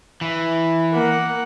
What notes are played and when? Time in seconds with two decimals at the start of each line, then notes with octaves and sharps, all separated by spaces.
0.21 E3
0.93 A#3 F#5